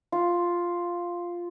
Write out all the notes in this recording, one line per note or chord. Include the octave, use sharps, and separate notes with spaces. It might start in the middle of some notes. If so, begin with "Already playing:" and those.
F4